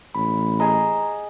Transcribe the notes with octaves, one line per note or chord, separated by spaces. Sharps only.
A1 B5
G#4 D#5 A#5